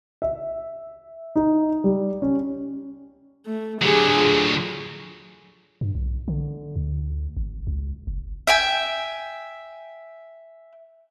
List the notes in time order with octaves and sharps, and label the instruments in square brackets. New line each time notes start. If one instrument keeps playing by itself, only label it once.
[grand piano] E5
D#4
G3
C#4
[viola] A3
[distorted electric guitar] D3 F#3 [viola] G4 G#4
[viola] F4
[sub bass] G2
B1
D3
D2
G#1
C#2
F#1
[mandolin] E5 G5 G#5